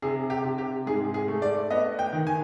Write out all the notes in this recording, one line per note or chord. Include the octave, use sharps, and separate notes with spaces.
C3 G#4
G4
C3
G4
G#2 G#4
G#4
A3
D5
B3 D#5
G5
D#3
G#5